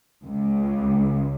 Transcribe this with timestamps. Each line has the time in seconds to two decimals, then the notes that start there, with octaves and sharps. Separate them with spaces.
0.24 C#2